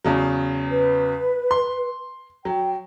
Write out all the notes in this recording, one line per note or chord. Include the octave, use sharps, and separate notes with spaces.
E2 C#3 F#3
B4
C6
F#3 G5